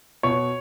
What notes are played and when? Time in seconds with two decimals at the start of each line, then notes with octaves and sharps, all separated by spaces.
0.23 B2 C#5